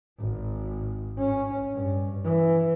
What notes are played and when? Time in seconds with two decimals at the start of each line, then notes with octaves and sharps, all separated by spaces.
0.20 G#1
1.19 C#4
1.75 G2
2.24 E3